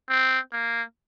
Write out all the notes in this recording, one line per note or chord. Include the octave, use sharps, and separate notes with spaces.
C4
A#3